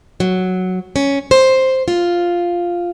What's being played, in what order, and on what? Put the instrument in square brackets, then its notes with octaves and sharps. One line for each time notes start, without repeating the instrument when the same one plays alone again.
[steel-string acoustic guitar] F#3
C#4
C5
F4